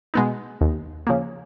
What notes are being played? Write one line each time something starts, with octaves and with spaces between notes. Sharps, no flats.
B2 G#3 B3 D#4
D#2
C#3 F3 A#3